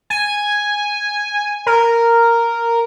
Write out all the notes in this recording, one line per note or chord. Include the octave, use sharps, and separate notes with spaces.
G#5
A#4